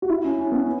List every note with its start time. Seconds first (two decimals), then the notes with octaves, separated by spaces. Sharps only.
0.02 F#4
0.09 E4
0.24 C#4
0.39 C#4
0.51 B3
0.63 C#4